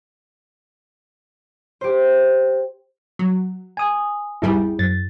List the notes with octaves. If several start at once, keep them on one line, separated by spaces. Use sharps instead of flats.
G4 C5
F#3
G#5 D#6
G#1 E2 G3 E4 G#4
F#2 A6